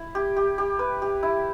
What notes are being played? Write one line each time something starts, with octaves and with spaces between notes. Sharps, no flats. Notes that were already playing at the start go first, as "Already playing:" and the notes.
Already playing: E4
G4
G4
G4
B4
G4
E4